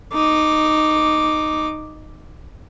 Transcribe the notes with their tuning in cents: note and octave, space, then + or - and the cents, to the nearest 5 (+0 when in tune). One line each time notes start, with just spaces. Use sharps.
D#4 -10 D6 +0